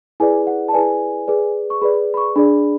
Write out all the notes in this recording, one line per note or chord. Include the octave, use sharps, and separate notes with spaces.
E4 G#4 B4 D5 G#5
F#5
A5
E4 G#4 B4 D5 G#5
G#4 B4 D5
C#6
G#4 B4 D5 B5
B5
C#6
D4 G#4 D5 B5